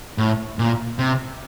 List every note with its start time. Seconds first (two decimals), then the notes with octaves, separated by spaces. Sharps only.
0.18 A2
0.59 A#2
0.99 C3